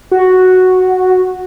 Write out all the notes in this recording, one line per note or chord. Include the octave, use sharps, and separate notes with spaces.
F#4